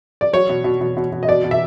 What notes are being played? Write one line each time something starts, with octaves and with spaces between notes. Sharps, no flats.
D5
F#3 C#5
B2
B2
B2
B2
B2
D#5
B2 D5
B2
E5